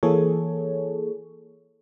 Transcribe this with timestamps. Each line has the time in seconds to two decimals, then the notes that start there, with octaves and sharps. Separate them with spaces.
0.03 E3 A#3 G#4 A4 C#5